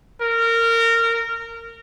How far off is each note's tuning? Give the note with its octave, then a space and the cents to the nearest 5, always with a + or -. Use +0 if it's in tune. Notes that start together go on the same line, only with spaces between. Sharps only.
A#4 -20